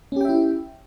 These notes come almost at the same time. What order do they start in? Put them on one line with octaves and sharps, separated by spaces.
C#4 G4 G5 E5 E4